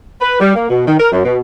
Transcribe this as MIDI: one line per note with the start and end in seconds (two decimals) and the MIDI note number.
0.21 0.40 71
0.40 0.54 55
0.55 0.67 58
0.70 0.85 47
0.88 0.98 51
1.00 1.07 70
1.12 1.22 42
1.25 1.39 47